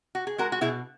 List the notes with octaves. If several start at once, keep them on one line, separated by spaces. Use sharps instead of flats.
F#4
G#4
G#3 F#4 A#4
F#4
B2 E4 G#4